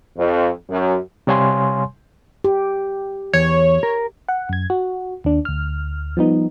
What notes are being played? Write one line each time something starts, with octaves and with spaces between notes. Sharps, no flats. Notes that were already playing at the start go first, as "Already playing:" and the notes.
F2
F#2
C3 G3 C#5 F5 G#5 C6
G4
E2 C#5
A#4
F#5
F#2 G#6
F#4
D#2 D4
D2 F6
F3 G3 B3 D#4